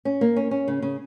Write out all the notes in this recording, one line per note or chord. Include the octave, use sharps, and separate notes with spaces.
C#4
A#3
C#4
C#4
C#3
C#3